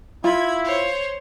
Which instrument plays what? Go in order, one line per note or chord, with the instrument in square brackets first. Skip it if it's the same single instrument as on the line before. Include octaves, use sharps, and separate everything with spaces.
[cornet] E4 [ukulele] F4 [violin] B5 G#6
[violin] C5 C#5